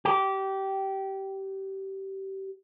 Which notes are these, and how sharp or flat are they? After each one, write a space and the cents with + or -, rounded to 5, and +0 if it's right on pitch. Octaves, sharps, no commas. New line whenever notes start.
G4 -20